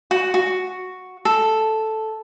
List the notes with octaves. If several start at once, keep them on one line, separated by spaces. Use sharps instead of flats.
F#4
F#4
A4